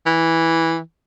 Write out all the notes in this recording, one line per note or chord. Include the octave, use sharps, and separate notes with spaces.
E3